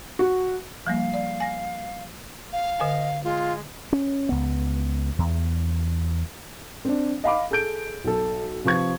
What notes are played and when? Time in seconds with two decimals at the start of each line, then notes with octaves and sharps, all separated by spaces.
0.19 F#4
0.86 F3 G3 A#3 F5
1.14 D5
1.40 G#5 A#6
2.53 F5
2.80 D3 A#4 D#5 G#5
3.24 G#3 F4
3.93 C#4
4.29 C#2 B3
5.19 E2
6.85 C4 D4
7.24 D#5 F5 B5 D6
7.51 G#4 A4 G6 D7
8.04 B1 A4
8.64 C3 F3 B4 C#6 G#6